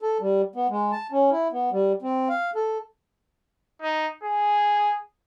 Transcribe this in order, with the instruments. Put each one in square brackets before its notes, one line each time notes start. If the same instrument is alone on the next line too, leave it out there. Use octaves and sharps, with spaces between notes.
[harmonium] A4
G3
B3
G#3
A5
C#4
E4
B3
G3
C4
F5
A4
[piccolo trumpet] D#4
G#4